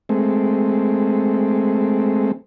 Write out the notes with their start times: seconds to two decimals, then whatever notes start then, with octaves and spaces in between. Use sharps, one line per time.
0.09 G#3 A3 C4